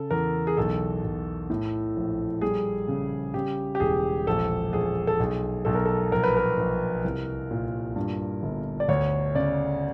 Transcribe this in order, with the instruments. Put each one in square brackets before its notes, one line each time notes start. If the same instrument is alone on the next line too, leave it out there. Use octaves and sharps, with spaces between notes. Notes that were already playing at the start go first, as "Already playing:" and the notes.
Already playing: [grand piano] C#3 A4
E2 A#4
G#4
B1 A4
B1
A2
A#1
G3 G#4
C#3
C#3 G4
G4
E1 G#4
A#1 A4
A#1 G#4
A4
B1 G#4
B1 A4
A#4
A4
A#1 A#4
B4
A#4
A#1
C2
A#2
G2
G1
D5
D2 C#5
C#3 D5